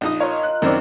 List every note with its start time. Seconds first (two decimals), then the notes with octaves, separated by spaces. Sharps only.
0.01 A#1 D#4 D#6
0.20 F4 A#4 C#5 D#5
0.43 F#6
0.62 F#2 D#3 C4 E4 A#4 C#5 D5